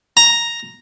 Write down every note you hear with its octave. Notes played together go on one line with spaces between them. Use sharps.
A#5